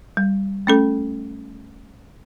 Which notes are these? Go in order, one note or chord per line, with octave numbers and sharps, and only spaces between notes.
G3
A3 C#4 A4